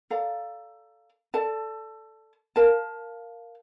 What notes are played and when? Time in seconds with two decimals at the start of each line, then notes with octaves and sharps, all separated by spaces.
0.10 A4 D5 F5 A#5
1.34 A4 D5 A5
2.56 A#4 F5 A5